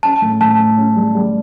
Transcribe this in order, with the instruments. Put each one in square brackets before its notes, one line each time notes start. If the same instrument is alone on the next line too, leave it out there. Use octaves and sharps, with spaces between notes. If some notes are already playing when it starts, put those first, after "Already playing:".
[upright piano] C#4 [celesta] A5
[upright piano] A2
[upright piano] A2 [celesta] A5
[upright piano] A2
C#4
G3
G3